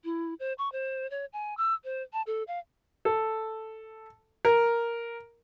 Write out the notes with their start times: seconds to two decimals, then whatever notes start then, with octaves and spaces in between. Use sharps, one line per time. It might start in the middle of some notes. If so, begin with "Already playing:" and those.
0.04 E4
0.39 C5
0.58 C#6
0.72 C5
1.10 C#5
1.33 G#5
1.57 E6
1.84 C5
2.13 A5
2.27 A4
2.47 F5
3.05 A4
4.45 A#4